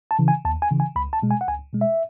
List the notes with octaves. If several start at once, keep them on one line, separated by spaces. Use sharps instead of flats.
A5
C#3 E3
G#5
D#2 A5
G#5
C#3 E3
G#5
C#2 B5
A5
B2 G#3
G#5
F#5
C#2 G#5
B2 G#3
E5